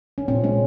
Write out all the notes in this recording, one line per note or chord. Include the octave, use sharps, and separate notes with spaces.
C#4
A#2 C4
G#3 C#4